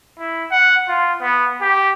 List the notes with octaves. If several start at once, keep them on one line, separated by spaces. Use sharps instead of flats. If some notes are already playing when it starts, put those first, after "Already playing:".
E4
F#5
F4
B3
G4